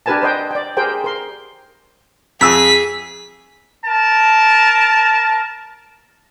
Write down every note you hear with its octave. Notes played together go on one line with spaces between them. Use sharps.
D4 G4 A#4 B4 G#5 A5
B4 C5 D#5 G5
D5 G5
G4 G#4 A#4 C5 G5
A#4 C6
F2 G#4 E6 B6
A#4 A5